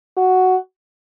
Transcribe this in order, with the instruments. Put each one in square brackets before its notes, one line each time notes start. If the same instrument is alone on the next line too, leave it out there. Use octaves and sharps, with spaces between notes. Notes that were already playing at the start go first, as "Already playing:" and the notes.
[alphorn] F#4